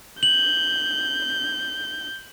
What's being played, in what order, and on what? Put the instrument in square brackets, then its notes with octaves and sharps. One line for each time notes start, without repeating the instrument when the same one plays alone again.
[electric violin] G6 [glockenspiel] F#7